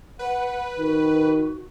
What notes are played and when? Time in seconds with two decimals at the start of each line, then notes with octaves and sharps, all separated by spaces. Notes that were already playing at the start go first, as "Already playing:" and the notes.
0.19 B4 F#5
0.78 D#3 F#4